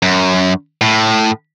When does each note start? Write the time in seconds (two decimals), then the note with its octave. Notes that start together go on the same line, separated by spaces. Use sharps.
0.02 F#2
0.81 A2